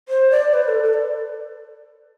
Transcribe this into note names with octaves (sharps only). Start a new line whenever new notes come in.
C5
D5
B4
A4
A4
D5